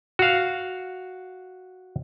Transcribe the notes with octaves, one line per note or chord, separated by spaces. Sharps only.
F#4 F5